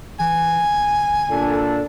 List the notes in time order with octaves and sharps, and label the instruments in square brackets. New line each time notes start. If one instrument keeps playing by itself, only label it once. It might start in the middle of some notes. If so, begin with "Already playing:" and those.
[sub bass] E3 [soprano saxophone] G#5
[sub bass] G1
[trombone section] A#2 D4 A4